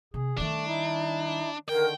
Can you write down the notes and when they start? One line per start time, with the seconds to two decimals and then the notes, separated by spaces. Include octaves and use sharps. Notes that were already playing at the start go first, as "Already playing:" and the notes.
0.14 C3 G#4
0.38 D#3 G3 A3 D4
0.66 D#4 E4
1.69 D3 D#3 A#4 G5